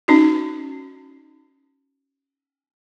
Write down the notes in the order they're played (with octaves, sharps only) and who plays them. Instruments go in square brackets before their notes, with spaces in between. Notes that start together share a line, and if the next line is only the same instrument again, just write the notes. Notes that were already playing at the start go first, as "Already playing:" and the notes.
[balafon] C#4 D#4 F#4